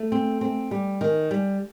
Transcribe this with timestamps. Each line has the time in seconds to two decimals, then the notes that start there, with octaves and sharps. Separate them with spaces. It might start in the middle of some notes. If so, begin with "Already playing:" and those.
Already playing: A3
0.12 C4
0.41 C4
0.71 G3
1.01 D#3
1.31 G3